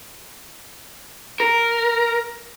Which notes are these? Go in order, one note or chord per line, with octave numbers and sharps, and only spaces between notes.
A#4